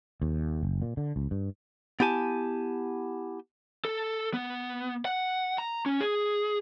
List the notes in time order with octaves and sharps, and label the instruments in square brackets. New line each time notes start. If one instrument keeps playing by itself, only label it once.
[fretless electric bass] D#2
F#1
A#2
D3
C#2
G2
[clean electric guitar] B3 E4 G4 G#5 A5
[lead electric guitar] A4
B3
F#5
A#5
C#4
G#4